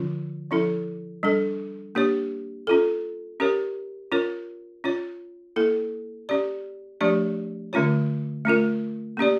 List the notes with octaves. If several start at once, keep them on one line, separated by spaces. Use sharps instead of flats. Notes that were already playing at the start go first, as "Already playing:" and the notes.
Already playing: D3 F3 C#4 F4
F3 C#4 E4 A4
G3 D4 A4
A#3 D4 G4 C#5
C#4 F4 A4
C#4 G4 A#4 C#5
C#4 F4 A#4 C#5
C#4 F4 C#5
A#3 E4 A4
C#4 G4 D5
F3 A3 D4 G4 D5
D3 A3 C#4 F4 C#5
A3 C#4 F4 A#4
A#3 C#4 G4 D5